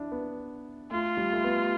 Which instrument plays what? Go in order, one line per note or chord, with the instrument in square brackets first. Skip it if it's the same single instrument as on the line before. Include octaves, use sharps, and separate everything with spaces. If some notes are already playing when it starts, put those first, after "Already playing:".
Already playing: [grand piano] D4 E4
B3
[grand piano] A3 [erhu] F4
[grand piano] G3
A3
B3